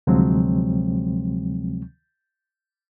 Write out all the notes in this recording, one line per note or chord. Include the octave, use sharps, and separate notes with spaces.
D2 C3 F3 F#3 G#3 C4